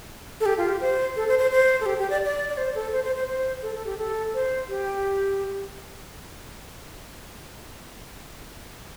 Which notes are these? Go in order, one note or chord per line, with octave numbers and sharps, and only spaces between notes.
A4
G4
F4
G4
C5
A4
C5
C5
C5
A4
G4
G4
D5
D5
D5
C5
A4
C5
C5
C5
C5
A4
A4
G4
A4
C5
G4